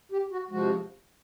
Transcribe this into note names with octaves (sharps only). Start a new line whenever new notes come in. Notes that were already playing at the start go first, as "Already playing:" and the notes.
G4
F#4
C3 F3 G#3 F#4